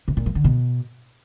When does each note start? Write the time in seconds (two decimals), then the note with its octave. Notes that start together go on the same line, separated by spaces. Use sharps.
0.08 C3
0.17 A#2
0.26 F3
0.35 D3
0.44 B2